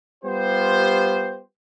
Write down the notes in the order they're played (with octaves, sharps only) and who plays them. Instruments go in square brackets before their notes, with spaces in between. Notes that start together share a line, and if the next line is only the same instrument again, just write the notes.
[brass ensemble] G3 B3 F4 G4 C5